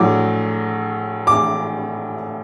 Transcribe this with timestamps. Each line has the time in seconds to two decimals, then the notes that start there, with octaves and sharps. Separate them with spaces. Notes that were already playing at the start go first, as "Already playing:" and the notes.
Already playing: A#1 A2 F#3 D6
1.27 D6